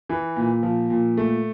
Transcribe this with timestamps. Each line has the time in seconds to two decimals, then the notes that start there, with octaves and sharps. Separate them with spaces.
0.09 E3
0.36 A#2
0.63 F3
0.90 A#2
1.17 A3